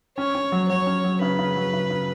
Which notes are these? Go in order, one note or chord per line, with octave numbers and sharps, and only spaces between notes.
C#4 C#5
C#4
F#3
F#3 C#5
C#4
F#3
C#3 B4
C#3
F#3
C#3
C#3